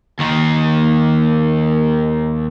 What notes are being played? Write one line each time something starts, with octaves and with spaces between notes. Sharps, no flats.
D#2 D#3